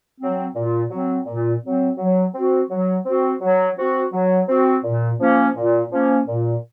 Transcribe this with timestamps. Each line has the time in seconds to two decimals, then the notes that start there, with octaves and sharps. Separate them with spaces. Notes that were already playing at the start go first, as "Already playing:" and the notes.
0.19 F#3 C4
0.55 A#2
0.91 F#3 C4
1.26 A#2
1.62 F#3 C4
1.98 F#3
2.34 C4 F#4
2.70 F#3
3.05 C4 F#4
3.41 F#3
3.77 C4 F#4
4.13 F#3
4.48 C4 F#4
4.84 A#2
5.20 F3 A#3 C#4
5.56 A#2
5.92 F3 A#3 C#4
6.28 A#2